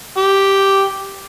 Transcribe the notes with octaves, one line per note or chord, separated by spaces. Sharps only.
G4